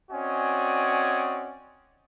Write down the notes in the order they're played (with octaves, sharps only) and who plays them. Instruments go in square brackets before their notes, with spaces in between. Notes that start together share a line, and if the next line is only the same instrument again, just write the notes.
[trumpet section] C4 C#4 F#4 D5 D#5 G#5